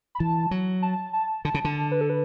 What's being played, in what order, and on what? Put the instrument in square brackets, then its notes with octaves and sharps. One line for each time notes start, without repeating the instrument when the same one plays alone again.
[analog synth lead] B5
[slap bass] E3 [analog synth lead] A5
[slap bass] F#3
[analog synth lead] A5
A5
[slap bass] D3 [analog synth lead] A5
[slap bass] C#3
D3
[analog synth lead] B4
A4
B4